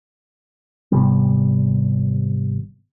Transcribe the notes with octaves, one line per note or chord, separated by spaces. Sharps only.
G#1 C3 G3 B3